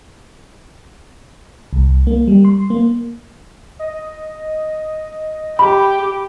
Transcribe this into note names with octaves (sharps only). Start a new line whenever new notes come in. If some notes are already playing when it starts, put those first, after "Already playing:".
C2
A#3
G3
C6
A#3
D#5
G4 B5